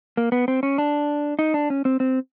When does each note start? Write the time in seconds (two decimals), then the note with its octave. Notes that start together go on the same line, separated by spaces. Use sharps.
0.17 A#3
0.32 B3
0.48 C4
0.63 C#4
0.78 D4
1.39 D#4
1.54 D4
1.70 C#4
1.85 C4
2.00 C4